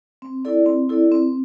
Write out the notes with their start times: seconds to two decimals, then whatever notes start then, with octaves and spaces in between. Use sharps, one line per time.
0.22 C4
0.45 E4 A4 D5
0.66 C4
0.89 E4 A4 D5
1.12 C4